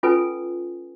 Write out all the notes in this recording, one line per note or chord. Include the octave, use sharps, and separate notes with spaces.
C#4 F4 A4 B4 G#5